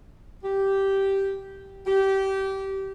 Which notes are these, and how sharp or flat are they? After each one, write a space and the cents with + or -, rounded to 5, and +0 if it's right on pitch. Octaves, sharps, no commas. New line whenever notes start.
G4 -5
G4 -20